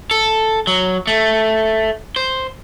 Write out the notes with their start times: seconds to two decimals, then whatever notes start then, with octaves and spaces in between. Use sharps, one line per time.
0.11 A4
0.67 F#3
1.07 A3
2.16 C5